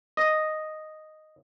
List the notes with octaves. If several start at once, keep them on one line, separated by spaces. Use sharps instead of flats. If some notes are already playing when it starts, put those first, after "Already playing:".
D#5